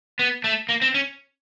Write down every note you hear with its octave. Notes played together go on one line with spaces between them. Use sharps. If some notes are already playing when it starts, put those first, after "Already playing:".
B3
A3
A#3
C4
C#4